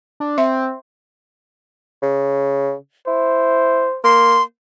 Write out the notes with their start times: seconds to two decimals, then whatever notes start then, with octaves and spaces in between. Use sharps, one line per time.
0.20 D4
0.38 C4 E5
2.02 C#3
3.07 E4 C5
4.04 A#3 C6